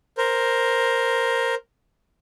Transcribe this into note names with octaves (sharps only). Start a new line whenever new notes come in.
A#4 C5